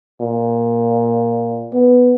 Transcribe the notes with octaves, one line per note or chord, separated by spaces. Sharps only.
A#2
B3